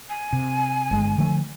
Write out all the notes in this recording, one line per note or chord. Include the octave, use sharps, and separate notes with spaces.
G#5
C3
G1 G#3
D3 F3 A3